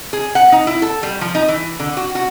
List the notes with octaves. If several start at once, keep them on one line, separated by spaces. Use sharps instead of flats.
G#4
F#5
D#4
E4
A4
G3
F3
D#4
E3
D3
F#4
F#4